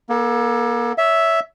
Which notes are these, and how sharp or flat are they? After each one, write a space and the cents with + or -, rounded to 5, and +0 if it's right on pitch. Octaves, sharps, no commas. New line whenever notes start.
A#3 +40 A4 +0
C#5 +30 E5 +0